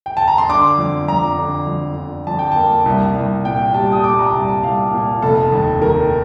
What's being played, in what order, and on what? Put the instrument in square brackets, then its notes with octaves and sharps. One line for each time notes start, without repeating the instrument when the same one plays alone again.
[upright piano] G5
A5
A#5
C6
D3 D6
F2
F2 A#5
D3
F2
D3
F2 A5
G5
A#3 A5
C2
C2
A#2 G5
G3 A5
D#6
A#2 D6
A#5
C2 A5
A5
C2 F5
A#2
F1 A4
D#2
D#3 A#4